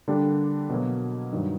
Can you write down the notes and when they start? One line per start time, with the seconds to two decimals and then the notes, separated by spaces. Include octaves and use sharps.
0.08 D3 G3 A#3 D4 G4
0.70 B2 F#3 A#3
1.32 G2 D#3 F#3